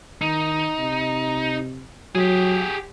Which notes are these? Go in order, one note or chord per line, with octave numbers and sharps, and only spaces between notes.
D#3 D#4
C3
F#3 G4 G#4